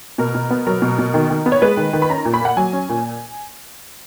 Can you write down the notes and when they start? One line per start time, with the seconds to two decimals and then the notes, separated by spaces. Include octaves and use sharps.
0.18 B2 A#4
0.35 B2
0.51 B3
0.67 F#3 A#4
0.82 B2
0.99 B2
1.14 D#3
1.30 D#3
1.46 B3
1.52 C#5
1.62 G#3 B4
1.77 D#3
1.93 D#3
2.02 B5
2.09 C#4 A#5
2.25 A#2
2.34 B5
2.41 A#3 F#5
2.57 F#3 G#5
2.73 C#4
2.89 A#2